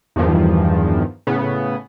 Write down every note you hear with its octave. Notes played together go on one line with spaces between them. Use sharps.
E2 G2 D#3 F3
A2 C#3 B3